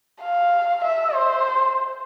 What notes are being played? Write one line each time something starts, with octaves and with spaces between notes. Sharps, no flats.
F5
E5
C5